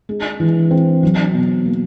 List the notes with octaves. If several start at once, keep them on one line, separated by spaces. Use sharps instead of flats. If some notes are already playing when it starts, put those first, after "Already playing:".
G#3
E3
C4
F#3
B2
A#3